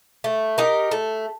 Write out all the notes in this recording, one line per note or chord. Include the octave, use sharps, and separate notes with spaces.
A3
D#4 G4 A#4
A3